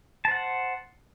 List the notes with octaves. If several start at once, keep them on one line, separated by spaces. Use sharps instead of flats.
C5 F#5 A5